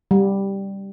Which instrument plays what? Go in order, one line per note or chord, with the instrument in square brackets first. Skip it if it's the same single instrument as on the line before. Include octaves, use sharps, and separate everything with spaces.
[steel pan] G3